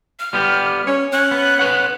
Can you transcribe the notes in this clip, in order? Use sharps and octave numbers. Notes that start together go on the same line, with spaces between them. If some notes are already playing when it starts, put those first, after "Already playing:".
F6
G3 B3 G4
C#4 C#5
C#4 F#6
B3
B4 C#5 F#5